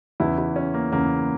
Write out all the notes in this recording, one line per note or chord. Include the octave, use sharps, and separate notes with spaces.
E2 C#3 E3 E4
E4
C#4
A#3
E2 C#3 E3 A#3